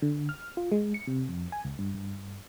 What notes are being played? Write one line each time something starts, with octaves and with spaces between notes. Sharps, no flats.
D3
F6
F4
G#3
C#7
C3
F2
G#5
C#2
G2
G2